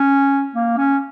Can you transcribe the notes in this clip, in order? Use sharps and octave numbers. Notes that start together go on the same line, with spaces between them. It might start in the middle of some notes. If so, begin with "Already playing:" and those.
Already playing: C#4
A#3
C#4